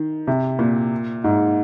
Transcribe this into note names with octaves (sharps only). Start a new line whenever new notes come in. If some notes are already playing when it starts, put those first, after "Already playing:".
Already playing: D#3
C3
A#2
G#2